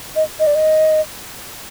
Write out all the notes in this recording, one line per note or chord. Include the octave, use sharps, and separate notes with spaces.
D#5
D#5
D5
D#5